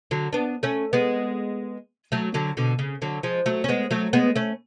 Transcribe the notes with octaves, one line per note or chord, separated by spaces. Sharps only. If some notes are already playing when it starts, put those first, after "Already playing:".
D3 F#3
B3 D4
A3 C#4
G#3 B3
F#3 A3
D3 F#3
B2 D3
C#3
D3 F#3
F3 G#3
F#3 A3
C#4
G#3 B3
F#3 A3
G#3 B3
A3 C#4